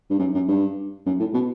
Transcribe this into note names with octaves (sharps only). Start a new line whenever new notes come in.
G2
F#2
F#2
G2
F#2
A2
B2